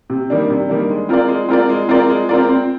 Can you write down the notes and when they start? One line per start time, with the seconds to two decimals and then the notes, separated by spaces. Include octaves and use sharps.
0.10 C3
0.30 D#3 G3 A#3 D4
0.50 C3
0.69 D#3 G3 A#3 D4
0.90 G#3
1.09 C4 F4 A#4 D5
1.29 G#3
1.49 C4 F4 A#4 D5
1.70 G#3
1.89 C4 F4 A#4 D5
2.09 G#3
2.29 C4 F4 A#4 D5
2.49 C4